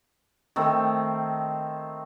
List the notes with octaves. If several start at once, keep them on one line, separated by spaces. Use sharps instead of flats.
D#3 A3 C4